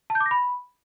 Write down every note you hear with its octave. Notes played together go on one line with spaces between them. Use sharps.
A5
G6
D6
A#6
B5